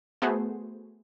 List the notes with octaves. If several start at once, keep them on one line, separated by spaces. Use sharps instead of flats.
A3 B3 F#4 G#4 C5